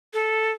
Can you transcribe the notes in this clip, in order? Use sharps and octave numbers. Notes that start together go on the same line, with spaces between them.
A4